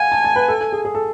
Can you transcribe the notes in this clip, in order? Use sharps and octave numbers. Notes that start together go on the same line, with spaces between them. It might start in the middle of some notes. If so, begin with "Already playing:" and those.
Already playing: F5 F#5 G#5
A5
A5
B4
A4
A4
G#4
G#4
A4